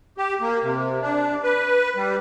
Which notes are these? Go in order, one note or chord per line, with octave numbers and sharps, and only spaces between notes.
G4
A#3
C3
D4
B4
G3